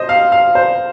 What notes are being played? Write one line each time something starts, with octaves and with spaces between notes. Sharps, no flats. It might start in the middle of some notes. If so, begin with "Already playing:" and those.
Already playing: C5 D#5
F5
F5
C5